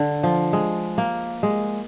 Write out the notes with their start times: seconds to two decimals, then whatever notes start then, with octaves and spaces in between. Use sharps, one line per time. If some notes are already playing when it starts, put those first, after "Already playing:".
Already playing: D3
0.23 F3
0.53 G#3
0.98 A#3
1.43 G#3